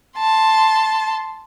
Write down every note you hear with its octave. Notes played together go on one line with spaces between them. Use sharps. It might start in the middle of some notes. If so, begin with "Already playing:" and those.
A5 C6